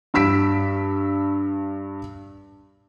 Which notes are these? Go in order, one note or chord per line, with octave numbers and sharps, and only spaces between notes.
G2 B5 E6 B6 D7